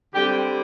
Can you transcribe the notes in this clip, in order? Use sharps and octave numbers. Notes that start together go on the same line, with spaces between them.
D3 G3 C4 G4